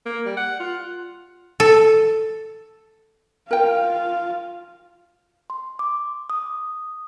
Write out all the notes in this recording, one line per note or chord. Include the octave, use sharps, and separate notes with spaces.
A#3
G3
F#5
F4
A4
F4 A#4 F5 G5
C6
D6
D#6